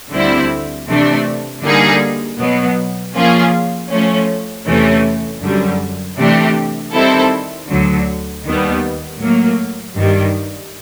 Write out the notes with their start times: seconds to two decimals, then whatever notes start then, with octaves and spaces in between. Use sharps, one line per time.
0.13 D2 D3 G3 C4 E4
0.89 C3 E3 A3 D4
1.63 D3 G3 A#3 D#4 G#4
2.39 B2 F#3 B3
3.15 F3 A#3 C#4 F4 G#4
3.90 F3 A3 C#4
4.67 E2 C3 E3 A3 C#4
5.43 F#2 D3 G3
6.18 C3 E3 A3 D4 G4
6.94 D#3 G3 C4 E4 A4
7.70 D2 D3 F#3
8.46 D#2 D#3 G3 B3
9.20 A2 F#3 A#3
9.96 G2 D#3 G3